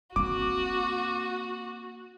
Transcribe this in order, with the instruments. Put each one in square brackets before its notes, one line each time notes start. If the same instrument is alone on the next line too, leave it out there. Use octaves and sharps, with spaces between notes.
[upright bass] A#3 C4 [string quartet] F#4 [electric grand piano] D6